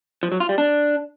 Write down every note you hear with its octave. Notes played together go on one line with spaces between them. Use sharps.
F3
F#3
F4
G3
D4